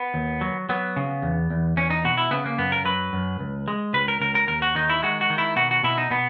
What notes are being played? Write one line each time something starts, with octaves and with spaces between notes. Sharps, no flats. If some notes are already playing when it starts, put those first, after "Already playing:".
Already playing: B3
D#2
F#3
F#3 B3
C#3
E2
E2
E2 C#4
D#4
B2 F#4
E4
C#3 B3
A#3
F#2 B3
A#4
F#3 B4
F#2
C#2
G#3
C#2 B4
A#4
C#2 A#4
A#4
D#2 A#4
F#4
D#3 D#4
E4
G#3 F#4
F#4
D#3
E4
B2 F#4
F#4
B2 E4
D#4
B2 B3